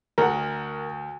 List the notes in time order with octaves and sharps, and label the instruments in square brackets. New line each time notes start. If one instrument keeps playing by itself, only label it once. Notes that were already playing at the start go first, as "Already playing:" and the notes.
[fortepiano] D2 [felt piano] A#4 [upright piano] F#5 A#5